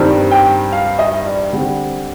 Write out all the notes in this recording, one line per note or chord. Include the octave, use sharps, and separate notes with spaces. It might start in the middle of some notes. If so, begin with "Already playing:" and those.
Already playing: G2 D#3 G3 C4
G5
F5
D#5
D5
D3 G3 C4